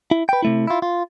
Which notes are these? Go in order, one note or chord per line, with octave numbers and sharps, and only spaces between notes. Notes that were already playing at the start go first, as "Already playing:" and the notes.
E4
B4 G5
C3 A3 E4
E4 F4
F4